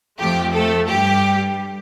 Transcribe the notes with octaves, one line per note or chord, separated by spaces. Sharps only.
F2 F3 A3 G4
A3 A4
G2 G3 G4